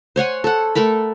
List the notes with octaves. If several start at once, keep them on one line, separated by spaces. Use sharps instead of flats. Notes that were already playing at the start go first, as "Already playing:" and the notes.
C5 C#5 F#5 G#5
A4 F#5
A3 A4 A#4 B5